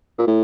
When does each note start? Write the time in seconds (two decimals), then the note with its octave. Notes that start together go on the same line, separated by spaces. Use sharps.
0.18 A#2
0.27 A2